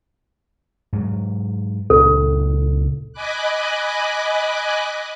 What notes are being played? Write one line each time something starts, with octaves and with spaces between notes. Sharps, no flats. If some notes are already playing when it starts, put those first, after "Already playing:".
G#2 F#3
C#2 A#2 D4 A4
D#5 G#5 B5 D6 F#6